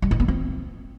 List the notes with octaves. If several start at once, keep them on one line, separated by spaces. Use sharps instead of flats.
G3
D#4
B3
C4